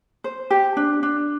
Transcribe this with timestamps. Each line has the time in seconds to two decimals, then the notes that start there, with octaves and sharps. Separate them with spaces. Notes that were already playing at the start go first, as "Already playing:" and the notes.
0.24 C5
0.50 G4
0.77 D4
1.03 D4